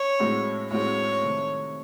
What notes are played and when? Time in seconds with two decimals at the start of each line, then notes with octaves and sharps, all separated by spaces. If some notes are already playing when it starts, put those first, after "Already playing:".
Already playing: C#5
0.20 A2 G#3 C4 F#4
0.71 A2 G#3 C4 F#4 C#5
1.22 C3 D#3 A3